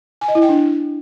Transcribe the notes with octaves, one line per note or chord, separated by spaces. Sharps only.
G#5
D#5
E4
G5
D4